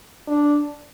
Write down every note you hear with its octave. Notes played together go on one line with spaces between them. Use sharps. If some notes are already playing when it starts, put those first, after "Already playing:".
D4